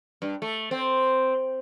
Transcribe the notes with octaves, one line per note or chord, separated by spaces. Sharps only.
G2
A3
C4